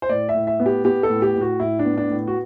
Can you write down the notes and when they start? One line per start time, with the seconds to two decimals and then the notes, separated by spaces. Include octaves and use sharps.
0.02 C5
0.09 A2 D5
0.29 E5
0.34 A2
0.47 E5
0.60 B3
0.66 G4
0.84 B3 G4
1.03 A4
1.10 A2
1.22 G4
1.36 A2
1.41 F#4
1.60 A2 E4
1.79 D4
1.85 B3
1.97 D4
2.10 A2
2.27 F#4